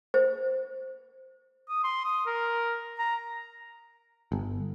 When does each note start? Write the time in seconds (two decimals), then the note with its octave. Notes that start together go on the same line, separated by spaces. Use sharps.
0.14 C5
1.69 D#6
1.84 C6
2.05 D#6
2.26 A#4
2.99 A#5
4.32 G1